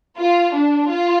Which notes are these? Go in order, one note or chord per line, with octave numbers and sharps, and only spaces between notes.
F4
D4
F4